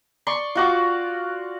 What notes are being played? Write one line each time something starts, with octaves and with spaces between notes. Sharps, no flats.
D5 C6 C#6
F4 F#4 D6